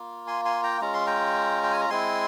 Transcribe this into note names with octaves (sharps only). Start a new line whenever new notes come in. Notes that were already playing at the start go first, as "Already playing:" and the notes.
Already playing: A#3 F4
G#5 C6
G#5 C6
G5 A#5
G#3 C#4 F4 A#5
C6
G5 A#5
G5
G#5
A#5
G#3 C4 E4 G#5 C6